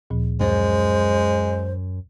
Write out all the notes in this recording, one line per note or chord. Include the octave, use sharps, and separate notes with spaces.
D2 A#2 F3
F#2 G#3 C5